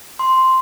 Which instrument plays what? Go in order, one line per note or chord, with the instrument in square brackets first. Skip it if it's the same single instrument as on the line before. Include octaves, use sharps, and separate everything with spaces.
[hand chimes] C6